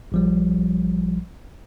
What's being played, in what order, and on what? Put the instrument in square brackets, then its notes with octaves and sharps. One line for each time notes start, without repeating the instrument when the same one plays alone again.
[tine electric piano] A#1 F3 G3